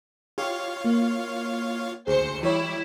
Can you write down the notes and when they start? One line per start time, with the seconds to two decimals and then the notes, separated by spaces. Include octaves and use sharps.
0.38 F4 G4 C#5 F5
0.84 A#3
2.07 D2 G#4 C5 C#7
2.43 E3 G3 E4 C#5